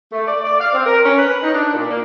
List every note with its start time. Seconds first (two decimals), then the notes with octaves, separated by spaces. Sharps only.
0.11 A3
0.27 D5
0.45 D5
0.59 F5
0.73 C4
0.86 A#4
1.05 C#4
1.18 B4
1.42 D#4
1.54 D4
1.73 A#2
1.89 A#3